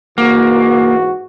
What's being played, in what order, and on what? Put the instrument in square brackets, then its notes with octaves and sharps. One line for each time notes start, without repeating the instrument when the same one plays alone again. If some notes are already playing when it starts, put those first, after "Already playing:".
[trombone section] G#2 E3 F#4 [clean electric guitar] A#3